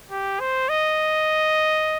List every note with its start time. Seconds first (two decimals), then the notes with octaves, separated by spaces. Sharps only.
0.11 G4
0.40 C5
0.69 D#5